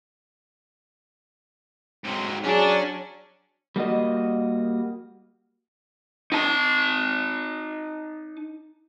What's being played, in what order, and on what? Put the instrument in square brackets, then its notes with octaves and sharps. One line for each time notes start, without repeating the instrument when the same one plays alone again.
[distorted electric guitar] G#2 F#3 [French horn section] C4
[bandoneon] F#3 [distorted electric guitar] C#4 C#5 [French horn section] D4 [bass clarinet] G#4
[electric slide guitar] G3 A#3 F#4 D#5
[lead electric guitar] D#4 A5